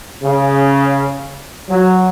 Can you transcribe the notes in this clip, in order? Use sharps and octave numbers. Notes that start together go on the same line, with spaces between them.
C#3
F#3